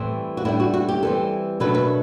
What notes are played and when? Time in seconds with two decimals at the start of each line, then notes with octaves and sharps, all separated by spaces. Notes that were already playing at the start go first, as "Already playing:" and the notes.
Already playing: A2 E3 G3 C4
0.37 F#4
0.45 A2 G3 D4 E4
0.60 F#4
0.74 F#4
0.89 G4
1.03 E3 G3 C4 A4
1.60 B2 F#3 A3 D4 B4
1.74 B4